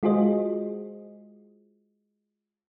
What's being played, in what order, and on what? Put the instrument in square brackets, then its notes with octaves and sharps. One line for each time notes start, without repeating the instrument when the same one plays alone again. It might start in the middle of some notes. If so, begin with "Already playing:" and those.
[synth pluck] G#3 F4 F#4 G#4 C5 D#5